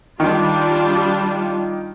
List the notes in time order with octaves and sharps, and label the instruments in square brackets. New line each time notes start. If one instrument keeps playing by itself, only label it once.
[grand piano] D#3 [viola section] G3 D4 F4